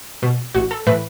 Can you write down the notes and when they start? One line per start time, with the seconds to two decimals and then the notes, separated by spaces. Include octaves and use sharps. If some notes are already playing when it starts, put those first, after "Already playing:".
0.22 B2
0.54 A1 F#4
0.71 A4
0.86 A2 E3 B4